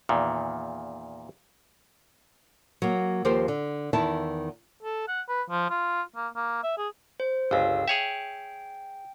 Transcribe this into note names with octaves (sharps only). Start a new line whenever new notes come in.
E2 A#2 D#3
F#3 A#3
D#2 F3 G4 A#4 C5
D3
E2 D#3 E4 E5 A5
A4
F#5
B4
F3
F4
A#3
A#3
E5
G#4
C5
G1 C#2 F5 E6
G#4 C#5 E5 G5